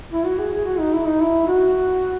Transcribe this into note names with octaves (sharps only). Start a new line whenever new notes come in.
E4
F#4
G#4
G#4
F#4
D#4
E4
D#4
E4
F#4